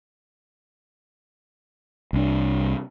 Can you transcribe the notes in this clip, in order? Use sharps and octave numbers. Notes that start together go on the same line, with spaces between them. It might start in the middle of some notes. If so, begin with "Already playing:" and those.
C2 D4